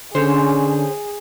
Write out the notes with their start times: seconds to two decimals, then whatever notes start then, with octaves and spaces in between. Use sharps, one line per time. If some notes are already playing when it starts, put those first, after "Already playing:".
0.15 D3 C#4 G#4 C5 C#5